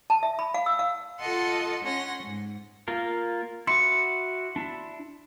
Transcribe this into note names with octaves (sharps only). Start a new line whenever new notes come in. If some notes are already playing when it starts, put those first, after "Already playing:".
A5
E5
B5
F5
E6
F5
F4 A4 D#5 F#5 A5 C6
C#4 F#5 C6 A#6
G#2
A#3 F4 A#4
E4 F#4 C6 D6 C#7
D4 E4